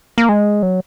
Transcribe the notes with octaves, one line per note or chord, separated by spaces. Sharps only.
A#3
G#3
F#3